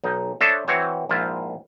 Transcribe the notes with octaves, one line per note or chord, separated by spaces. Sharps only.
B1 D#4
D4 A4 C5 C#5 D#5 E5
E3 C4 F#4 C#5
A#1 G#2 E4 F4 C5 F5